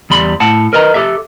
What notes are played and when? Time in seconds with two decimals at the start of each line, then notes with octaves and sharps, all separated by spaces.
0.10 E2 G3 B5 C6
0.40 A2 F#5 A5
0.73 A#4 B4 D#5 G#5 A#5
0.94 G4 A4 E5